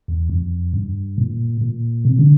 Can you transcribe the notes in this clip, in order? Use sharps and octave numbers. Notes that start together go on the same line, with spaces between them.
E2
F2
G2
A#2
A#2
C3
D3